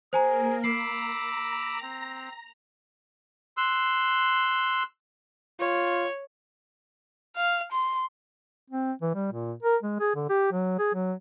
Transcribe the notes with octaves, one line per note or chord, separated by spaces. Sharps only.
A#3 G#4 A#4 C5 G#5 A#5
A#5 B5 D6 E6 C7
C4
C6 E6 F#6
F4 C#5
F5
C6
C4
E3
G3
A#2
A#4
G#3
G#4
D3
G4
F#3
G#4
F#3